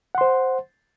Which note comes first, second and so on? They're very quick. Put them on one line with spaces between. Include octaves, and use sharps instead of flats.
F#5 C6 C5